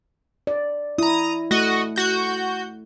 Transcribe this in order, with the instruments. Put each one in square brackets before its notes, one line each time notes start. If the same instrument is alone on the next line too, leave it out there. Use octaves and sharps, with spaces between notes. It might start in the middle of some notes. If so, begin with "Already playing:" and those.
[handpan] D5
[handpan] E4 [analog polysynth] A#5 D#6
[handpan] A3 [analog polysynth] F#4 D#5
[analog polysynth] F#4 G6